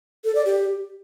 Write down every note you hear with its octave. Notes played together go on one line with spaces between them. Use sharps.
A4
D5
G4